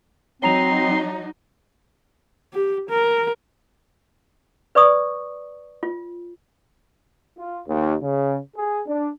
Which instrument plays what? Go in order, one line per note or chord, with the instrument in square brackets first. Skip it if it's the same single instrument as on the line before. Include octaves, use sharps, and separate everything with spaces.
[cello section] F#3 D#4 [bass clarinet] C4 [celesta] C#5 A#5 F7 [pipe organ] C6
[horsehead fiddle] G4
A#4
[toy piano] B4 D5 C#6 D#6
F4
[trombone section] F4
D#2
C#3
G#4
D4